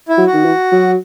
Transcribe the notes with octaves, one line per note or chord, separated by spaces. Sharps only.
E4
F#3
F#4
D#3
E3
F#3